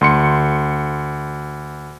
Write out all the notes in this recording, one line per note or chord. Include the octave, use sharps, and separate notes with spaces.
D2 C6 C#7